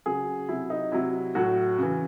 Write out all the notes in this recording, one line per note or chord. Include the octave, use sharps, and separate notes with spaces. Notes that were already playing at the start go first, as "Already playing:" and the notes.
C#3 F#3 G#4
C3 F#3 E4
D#4
C3 F#3 E4
A2 F#3 F#4
C#3 E3